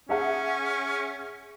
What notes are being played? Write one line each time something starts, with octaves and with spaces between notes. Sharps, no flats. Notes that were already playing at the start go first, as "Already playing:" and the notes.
C#4 G#4 E5 F#5